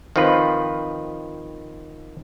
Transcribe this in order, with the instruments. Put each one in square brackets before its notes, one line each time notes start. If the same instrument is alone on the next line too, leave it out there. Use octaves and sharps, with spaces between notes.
[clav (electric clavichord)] D#3 F3 C4 F4 B4